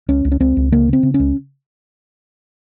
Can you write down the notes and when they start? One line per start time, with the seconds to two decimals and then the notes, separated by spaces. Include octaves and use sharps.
0.08 C#2 C#4
0.25 C#2
0.32 C#4
0.40 C#2 C4
0.57 C#2
0.72 C#3 A#3
0.88 C#3 C4
1.03 C#3
1.14 C#4
1.19 C#2